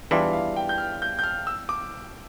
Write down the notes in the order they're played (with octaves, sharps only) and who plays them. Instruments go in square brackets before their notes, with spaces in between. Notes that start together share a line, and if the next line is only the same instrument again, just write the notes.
[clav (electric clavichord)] E2 E3 G3 D4 F4 [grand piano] E5
[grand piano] F5
G5
G6
F6
G6
G6
F6
E6
D6